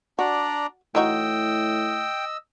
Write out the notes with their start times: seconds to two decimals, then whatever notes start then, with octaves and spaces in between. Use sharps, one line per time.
0.19 D4 F#4 D5 A#5
0.95 A2 E3 D#4 F#4 D#5 G5 E6